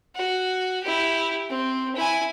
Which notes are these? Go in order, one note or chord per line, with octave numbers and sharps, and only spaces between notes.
F#4
E4 G4
C4
E4 G#5